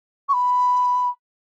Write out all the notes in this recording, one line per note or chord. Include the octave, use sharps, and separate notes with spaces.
C#6
B5